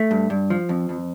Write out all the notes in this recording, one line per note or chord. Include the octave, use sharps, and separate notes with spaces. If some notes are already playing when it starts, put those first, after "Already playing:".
Already playing: A3
G2
G2
F3
F2
F2